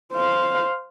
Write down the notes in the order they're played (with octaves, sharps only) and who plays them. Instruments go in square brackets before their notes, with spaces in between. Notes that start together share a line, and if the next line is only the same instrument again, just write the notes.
[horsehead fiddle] C5 F5